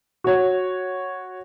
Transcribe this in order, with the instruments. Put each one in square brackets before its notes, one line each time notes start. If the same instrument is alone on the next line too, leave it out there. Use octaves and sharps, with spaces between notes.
[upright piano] F#4 C#5